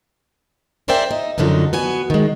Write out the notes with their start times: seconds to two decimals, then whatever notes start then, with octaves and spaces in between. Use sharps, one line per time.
0.88 G#4 A#4 C5 D5 E5 G5
1.11 D#4
1.38 F#2 D3 F3 F#3 D#4
1.73 B3 F#4 G#5
2.10 D#3 G#3